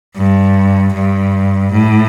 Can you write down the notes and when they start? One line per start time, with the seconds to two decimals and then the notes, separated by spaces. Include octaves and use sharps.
0.16 G2
0.94 G2
1.73 A2